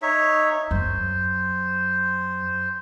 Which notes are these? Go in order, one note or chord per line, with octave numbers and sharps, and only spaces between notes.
D#4 C#5 E5
F#2 C5